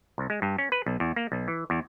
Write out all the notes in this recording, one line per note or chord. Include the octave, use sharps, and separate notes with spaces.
C2
G#3
G2
C#4
B4
B1
E2
A#3
B1
E3
E2